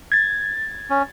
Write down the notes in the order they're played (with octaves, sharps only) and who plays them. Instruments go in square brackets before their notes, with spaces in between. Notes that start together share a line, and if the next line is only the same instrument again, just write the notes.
[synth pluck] G#6 A6
[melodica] C#4